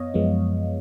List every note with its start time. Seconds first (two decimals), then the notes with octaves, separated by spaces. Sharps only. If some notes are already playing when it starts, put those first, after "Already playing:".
Already playing: F#2 B3 C#5 D#5 F5
0.14 F#2 F3 G#3 B3